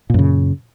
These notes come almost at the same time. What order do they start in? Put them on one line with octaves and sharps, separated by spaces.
A#2 F#2 C#3